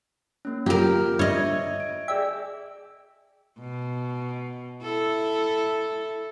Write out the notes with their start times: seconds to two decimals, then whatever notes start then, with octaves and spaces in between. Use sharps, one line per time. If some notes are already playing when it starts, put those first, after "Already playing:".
0.45 A#3 C#4
0.66 F#2 F4 G4 A#4
1.19 G2 C#5 D#5 E5 G#6
1.80 D7
2.08 G#4 D5 E5 G5
3.60 B2
4.83 E4 A4